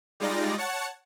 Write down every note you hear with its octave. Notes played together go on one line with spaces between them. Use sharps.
G3 G#3 D#4 F4 D5 A#6
C#5 F#5 A5 C#7